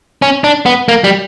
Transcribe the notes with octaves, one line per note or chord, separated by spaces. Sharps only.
C#4
D4
B3
A#3
G3